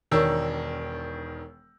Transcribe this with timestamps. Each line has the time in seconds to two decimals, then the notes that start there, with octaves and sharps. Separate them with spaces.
0.11 E1 D#3 D4 A#4 C#5 E6